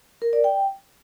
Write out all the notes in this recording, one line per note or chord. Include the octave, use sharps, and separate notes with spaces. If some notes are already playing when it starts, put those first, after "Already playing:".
A#4
D5
G5